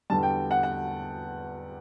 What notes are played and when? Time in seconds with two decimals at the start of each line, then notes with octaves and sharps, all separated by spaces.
0.10 E2 D3 G3 A5
0.23 G5
0.51 F#5
0.63 F#5